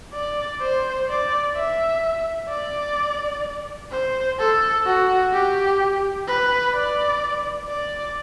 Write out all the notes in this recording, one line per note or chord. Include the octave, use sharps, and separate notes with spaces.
D5
C5
D5
E5
D5
C5
A4
F#4
G4
B4
D5
D5